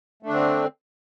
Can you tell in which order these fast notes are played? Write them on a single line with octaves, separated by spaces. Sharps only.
A3 D4 D3 C4